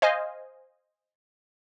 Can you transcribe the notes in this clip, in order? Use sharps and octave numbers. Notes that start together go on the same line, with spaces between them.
C5 D#5 F5 G#5